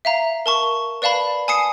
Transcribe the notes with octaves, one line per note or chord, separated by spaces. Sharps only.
E5 F5 A#5
A#4 A5 C#6
B4 D5 F5 A5 B5
G#5 A5 D#6 C7 C#7